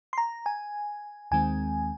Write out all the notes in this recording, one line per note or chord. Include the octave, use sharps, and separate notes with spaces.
C6
A#5
G#5
D#2 D#3 G#3 C4 G#5